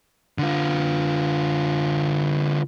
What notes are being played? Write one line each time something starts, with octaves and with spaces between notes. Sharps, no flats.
D3 F4